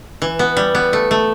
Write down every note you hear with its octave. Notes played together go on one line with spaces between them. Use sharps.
E3
B3
G3
B3
A3
A3